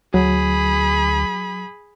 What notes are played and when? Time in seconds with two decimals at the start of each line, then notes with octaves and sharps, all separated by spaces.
0.14 D2 F#3 G#4 B5